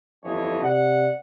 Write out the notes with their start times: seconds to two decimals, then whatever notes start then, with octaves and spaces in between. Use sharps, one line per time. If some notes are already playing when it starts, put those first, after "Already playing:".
0.24 G1 F2 E3 C#5 D#5
0.62 C3 D5 F#5